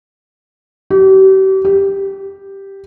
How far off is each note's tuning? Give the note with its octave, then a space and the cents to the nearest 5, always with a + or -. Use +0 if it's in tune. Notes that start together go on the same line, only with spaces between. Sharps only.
G4 -40
G4 +0